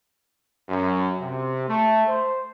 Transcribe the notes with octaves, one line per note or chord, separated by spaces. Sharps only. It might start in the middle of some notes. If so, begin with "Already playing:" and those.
F#2
C3
A3
C5